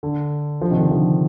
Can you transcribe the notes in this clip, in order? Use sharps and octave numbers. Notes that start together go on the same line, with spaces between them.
D3
D3 F3
C3 D#3
D3
D3 F3